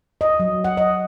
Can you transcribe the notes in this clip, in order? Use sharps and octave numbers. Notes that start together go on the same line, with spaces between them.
D#5
F#3
F#5
D#5